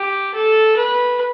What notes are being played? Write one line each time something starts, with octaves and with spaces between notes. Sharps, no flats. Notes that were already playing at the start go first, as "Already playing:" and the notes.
Already playing: G4
A4
B4